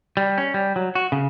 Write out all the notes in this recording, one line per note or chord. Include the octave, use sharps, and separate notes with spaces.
G3
C#4
G3
F#3
F#4
C#3